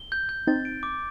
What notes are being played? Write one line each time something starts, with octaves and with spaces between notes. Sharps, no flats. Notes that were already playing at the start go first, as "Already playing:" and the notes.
Already playing: G7
G6
G6
C4 D#4 A6
D7
D6